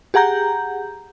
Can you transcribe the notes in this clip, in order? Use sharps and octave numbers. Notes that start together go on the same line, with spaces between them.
G4 G#4 F#5 A#5 G6